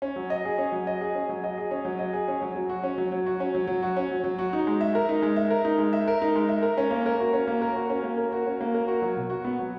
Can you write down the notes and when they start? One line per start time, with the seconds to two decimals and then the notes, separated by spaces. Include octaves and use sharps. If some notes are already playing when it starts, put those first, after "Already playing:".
0.02 C#4
0.16 F#3
0.30 D#5
0.45 G#4
0.58 C#4
0.72 F#3
0.87 D#5
1.01 G#4
1.15 C#4
1.29 F#3
1.44 D#5
1.58 G#4
1.71 C#4
1.85 F#3
1.99 D#5
2.13 G#4
2.28 C#4
2.42 F#3
2.56 F#3
2.69 F#4
2.83 C#4
2.98 F#3
3.12 F#3
3.26 F#4
3.40 C#4
3.55 F#3
3.67 F#3
3.82 F#4
3.97 C#4
4.11 F#3
4.24 F#3
4.38 F#4
4.53 D#4
4.67 G#3
4.81 E5
4.95 A#4
5.09 D#4
5.22 G#3
5.36 E5
5.50 A#4
5.65 D#4
5.78 G#3
5.93 E5
6.08 A#4
6.22 D#4
6.35 G#3
6.49 E5
6.63 A#4
6.77 C#4
6.91 A#3
7.06 A#4
7.20 F#4
7.33 C#4
7.47 A#3
7.62 A#4
7.75 F#4
7.90 C#4
8.03 A#3
8.18 A#4
8.32 F#4
8.46 C#4
8.61 A#3
8.74 A#4
8.88 F#4
9.02 F#3
9.17 B2
9.30 F#4
9.44 B3
9.59 F#3